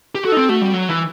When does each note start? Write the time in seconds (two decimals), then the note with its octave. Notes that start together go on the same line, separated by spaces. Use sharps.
0.15 G4
0.25 F#4 A4
0.32 D#4
0.37 C4
0.49 A3 F#4
0.61 G3
0.73 F#3
0.89 E3